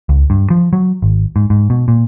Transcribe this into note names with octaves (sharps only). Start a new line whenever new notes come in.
C#2
G2
F3
F#3
G#1
G#2
G#2
B2
A#2